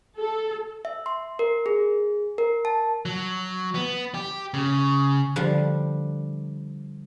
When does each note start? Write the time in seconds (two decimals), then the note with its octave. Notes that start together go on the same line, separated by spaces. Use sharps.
0.19 A4
0.85 E5
1.06 C6
1.39 A#4
1.66 G#4
2.38 A#4
2.65 A5
3.05 F#3
3.75 B3
4.15 G4
4.54 C#3
5.36 D3 F3 G3